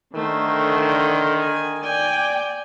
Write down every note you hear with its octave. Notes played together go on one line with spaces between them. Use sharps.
D3 D#3 A3 C5
G#5
D5 G5 G#5